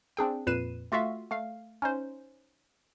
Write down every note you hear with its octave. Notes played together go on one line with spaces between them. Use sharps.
C4 D4 G#4 G5
F2 A#2 B4 C7 D#7 E7
A3 F4 F#4 E5 F5
A3 F5
C#4 D#4 C5